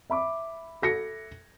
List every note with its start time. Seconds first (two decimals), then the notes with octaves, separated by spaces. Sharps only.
0.10 E5 B5 D6
0.82 A4 A#6 C#7